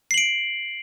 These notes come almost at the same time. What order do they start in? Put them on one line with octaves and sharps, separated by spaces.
C7 F#7 D7